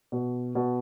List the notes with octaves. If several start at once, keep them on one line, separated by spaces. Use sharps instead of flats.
B2
B2